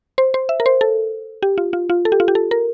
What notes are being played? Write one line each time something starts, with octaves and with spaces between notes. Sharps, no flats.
C5
C5
E5
A#4
C5
A4
G4
F4
F4
F4
A4
G4
F4
G4
A4
A#4